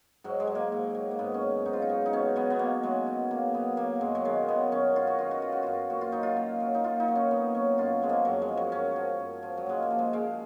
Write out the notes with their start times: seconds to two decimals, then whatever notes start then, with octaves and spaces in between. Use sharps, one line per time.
0.24 G#2 F#3
0.40 G#3
0.47 F#3
0.55 A#3
0.72 G#2
0.95 F#3
1.11 A#3
1.19 G#2 B3
1.34 C#4
1.42 F#3
1.65 G#2 D#4
1.73 F4
1.82 D#4
1.89 F#3
2.06 D#4
2.13 B2 C#4
2.36 F#3 B3
2.50 B3
2.59 B2 A#3
2.83 F#3 G#3
3.07 B2
3.31 F#3 A#3
3.54 B2 B3
3.77 F#3 A#3
4.01 F#2 G#3
4.15 F#3
4.25 D#3 G#3
4.48 F#3 B3
4.71 F#2 C#4
4.95 F#2 F4
5.07 F#4
5.18 D#3 F4
5.31 F#4
5.42 F#3 F4
5.52 F#4
5.63 F#2 F4
5.90 A#2 F#4
6.01 F4
6.12 F#3 D#4
6.23 F4
6.37 A#2
6.60 F#3
6.75 D#4
6.84 A#2 F4
7.00 D#4
7.08 F#3
7.15 C#4
7.31 A#2 B3
7.55 F#3 C#4
7.78 F#2 F4
8.02 F3 G#3
8.09 A#3
8.25 F#2 F#3
8.42 G#3
8.48 F3
8.57 F#3
8.72 F#2 C#4
8.96 F3
9.20 F#2
9.43 F3
9.57 F#3
9.66 A#2 G#3
9.83 A#3
9.90 F3
9.99 G#3
10.13 A#2 G#3